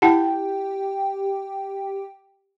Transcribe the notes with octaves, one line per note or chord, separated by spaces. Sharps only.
E4 G4 F#5 G5 A5